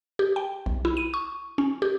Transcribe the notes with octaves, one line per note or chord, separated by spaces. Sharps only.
G4
G5
B1
E4
D#7
C#6
C#4
G4